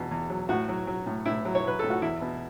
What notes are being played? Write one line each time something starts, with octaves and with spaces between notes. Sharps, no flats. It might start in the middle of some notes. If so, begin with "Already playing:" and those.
Already playing: E2 B2
E2
F#3
A2 F#4
F#3
F#3
A2
A2 E4
F#3
C#5
F#3 B4
A2 A4
F#4
E2 E4
B2